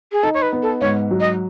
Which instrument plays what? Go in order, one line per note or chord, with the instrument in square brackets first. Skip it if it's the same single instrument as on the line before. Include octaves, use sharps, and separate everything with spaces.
[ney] G#4
[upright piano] D#4 [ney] A4
[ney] C#5
B4
[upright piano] B3
[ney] A4
[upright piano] G#2 [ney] C#5
[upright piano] F#3
[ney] D#5